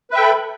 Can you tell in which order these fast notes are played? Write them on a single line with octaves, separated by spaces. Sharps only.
B4 E5 G5 A4 B5